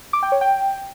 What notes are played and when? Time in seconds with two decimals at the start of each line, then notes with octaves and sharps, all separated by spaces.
0.13 D6
0.23 G5
0.32 C#5
0.41 G5